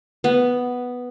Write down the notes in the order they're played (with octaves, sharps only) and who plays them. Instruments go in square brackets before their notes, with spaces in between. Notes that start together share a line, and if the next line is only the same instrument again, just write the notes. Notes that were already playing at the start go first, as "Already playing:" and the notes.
[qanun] B3